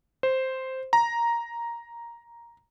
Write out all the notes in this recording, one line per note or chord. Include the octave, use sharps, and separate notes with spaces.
C5
A#5